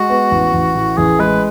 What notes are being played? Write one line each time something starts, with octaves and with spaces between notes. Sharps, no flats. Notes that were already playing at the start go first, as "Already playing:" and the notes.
Already playing: G#3 F#4
B3
A1
A1
A2
A1 G#4
G#3 B4